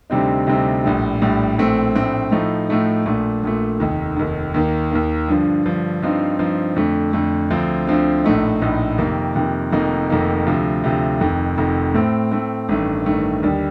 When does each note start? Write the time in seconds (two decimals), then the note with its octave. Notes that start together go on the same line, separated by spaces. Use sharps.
0.10 D2 C3 G3 C4 D#4
0.47 D2 C3 G3 C4 D#4
0.84 A#1 A2 G3
1.21 A#1 A2 G3
1.58 A#1 A2 A3 C4
1.95 A#1 A2 A3 C4
2.32 A2 F3 A3 D#4
2.69 A2 F3 A3 D#4
3.06 A#1 A#2 A3
3.43 A#1 A#2 A3
3.80 F1 D#2 D#3
4.16 F1 D#2 D#3
4.54 D#2 D#3 A#3
4.91 D#2 D#3 A#3
5.28 G2 D3 F3
5.66 G2 D3 F3
6.02 G2 F3 C4 D#4
6.39 G2 F3 C4 D#4
6.76 F2 D3 A3
7.13 F2 D3 A3
7.50 D2 D3 F3 C4
7.87 D2 D3 F3 C4
8.24 A#1 A2 A3 D#4
8.62 A#1 A2 A3 D#4
8.98 F2 C3 D#3 A#3
9.35 F2 C3 D#3 A#3
9.72 F1 F2 D#3 A#3 D#4
10.09 F1 F2 D#3 A#3 D#4
10.47 D2 C3 F3
10.84 D2 C3 F3
11.20 F1 F2 D#3
11.58 F1 F2 D#3
11.94 A2 A3 C4
12.32 A2 A3 C4
12.69 A1 G2 D#3 A3
13.06 A1 G2 D#3 A3
13.43 D#2 D3 G3